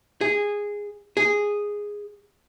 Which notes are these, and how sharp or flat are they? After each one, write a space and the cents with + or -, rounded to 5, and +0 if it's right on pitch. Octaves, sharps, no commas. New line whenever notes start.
G#4 -10
G#4 -5